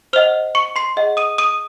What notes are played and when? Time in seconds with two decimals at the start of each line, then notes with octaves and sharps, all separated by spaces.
0.13 C5 D#5 F#5 F6 F7
0.55 C#6 C#7
0.76 C6 C7
0.97 G#4 D#5 F#5
1.17 D#6 D#7
1.38 D#6 D#7